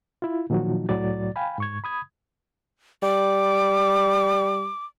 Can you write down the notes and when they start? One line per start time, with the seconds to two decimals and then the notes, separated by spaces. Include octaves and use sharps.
0.22 E4 F4
0.50 A#2 D#3 F3 F#3 D#4 F#4
0.89 C2 A2 F#3 D5 A6
1.36 F5 G5 G#5 B5
1.58 G#2 C#6 G#6
1.84 B5 D#6 G#6
3.03 G3 D6